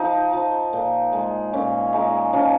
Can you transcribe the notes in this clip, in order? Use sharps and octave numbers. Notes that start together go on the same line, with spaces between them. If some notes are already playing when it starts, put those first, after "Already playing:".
Already playing: F3 D#4
F3
A#2
G#3
A#2 C#4
G#3 D#4
F3 C#4